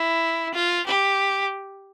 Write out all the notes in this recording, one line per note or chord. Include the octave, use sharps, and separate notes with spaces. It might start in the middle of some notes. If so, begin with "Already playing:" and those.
Already playing: E4
F4
G4